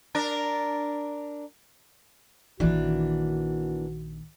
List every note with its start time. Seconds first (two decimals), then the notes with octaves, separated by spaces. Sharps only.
0.15 D4 A#4
2.60 A#1 D#3 E3 A#3 D4 F#4